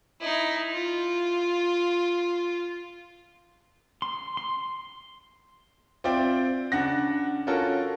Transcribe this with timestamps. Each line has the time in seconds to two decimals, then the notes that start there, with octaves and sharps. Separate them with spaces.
0.20 D#4 E4
0.72 F4
4.02 C6
4.37 C6
6.04 C4 F4 D5 E5 G5
6.72 C#3 D4 F#5 A#6
7.47 C#4 F4 F#4 A4 A#4